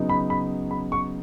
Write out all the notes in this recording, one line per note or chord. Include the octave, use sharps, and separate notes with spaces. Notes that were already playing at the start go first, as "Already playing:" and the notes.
Already playing: C#3 F#3 B3 D#4
B5
B5
B5
C#6